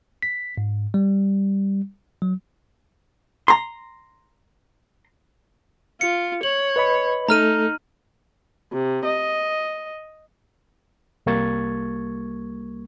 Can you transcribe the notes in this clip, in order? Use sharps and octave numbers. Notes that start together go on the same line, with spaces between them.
B6
G#2
G3
F#3
A#5 C6
F4 C#7
C#5 F#7
B4 D#5 B5
A3 D#4 A4 A#5 F6 D#7
C3
D#5
C2 G3 A#3 C#6 G#6 A6